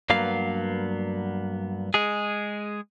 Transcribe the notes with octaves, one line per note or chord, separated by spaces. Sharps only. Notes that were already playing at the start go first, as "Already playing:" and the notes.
G2 F#3 A#3 B3 F5
G#3 G#4